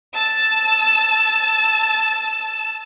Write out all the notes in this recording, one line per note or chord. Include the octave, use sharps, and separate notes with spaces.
A5 E6